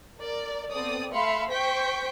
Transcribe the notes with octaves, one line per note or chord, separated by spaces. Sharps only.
A#4 D5
B3 C4 A4 D5 D#6
A3 E5 F5 B5 C6 C#7
C5 G5 C#6 G6 B6 D7